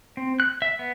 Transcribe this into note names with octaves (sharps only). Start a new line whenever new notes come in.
C4
F#6
E5
B3